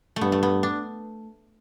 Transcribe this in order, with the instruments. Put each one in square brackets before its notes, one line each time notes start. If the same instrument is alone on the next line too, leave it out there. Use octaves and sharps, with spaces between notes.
[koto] A3
[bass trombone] G2 [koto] B3
[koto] A3
B3
D4